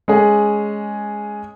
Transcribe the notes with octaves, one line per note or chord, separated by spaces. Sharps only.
G#3 C#4 G#4